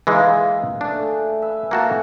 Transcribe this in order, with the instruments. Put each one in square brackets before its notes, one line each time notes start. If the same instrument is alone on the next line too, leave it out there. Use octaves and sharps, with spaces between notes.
[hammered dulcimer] A#2 F4 B4 [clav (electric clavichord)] E3 G#3 D#4
[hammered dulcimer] A3 G#4 [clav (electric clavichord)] D4
[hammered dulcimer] B4 E5 G#5
[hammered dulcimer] A2 F5 G#5 [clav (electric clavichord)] A#3 F#4 A5